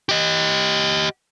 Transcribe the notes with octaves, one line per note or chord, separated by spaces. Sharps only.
G4 D#5